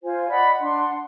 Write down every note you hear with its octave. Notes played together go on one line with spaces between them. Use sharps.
F4 C5 G#5
D5 D#5 F#5 B5
D4 F#5 C6